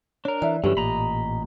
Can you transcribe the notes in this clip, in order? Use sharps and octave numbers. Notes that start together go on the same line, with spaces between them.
D4 A#4 C#5
E3 D5 E5
G2 D3 E3 F#3 C#4 G4
A1 A#2 D#5 A#5 B5